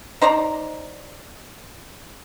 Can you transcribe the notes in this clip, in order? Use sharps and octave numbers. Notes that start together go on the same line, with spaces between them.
D#4 C5 D5 A#5